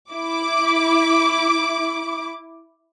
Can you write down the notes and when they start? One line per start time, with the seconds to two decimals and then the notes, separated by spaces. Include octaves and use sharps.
0.11 E4 D6